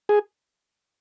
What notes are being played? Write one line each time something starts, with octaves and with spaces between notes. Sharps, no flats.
G#4